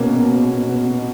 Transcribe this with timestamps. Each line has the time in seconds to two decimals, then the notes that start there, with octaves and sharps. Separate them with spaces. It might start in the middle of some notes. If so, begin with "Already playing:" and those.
Already playing: B2 A#3 C#4
0.12 B2
0.31 B2
0.50 B2
0.69 B2
0.88 B2